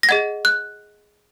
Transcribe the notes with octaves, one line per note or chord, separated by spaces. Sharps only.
A#6
G#4 D#5 F#5 G#6
F#6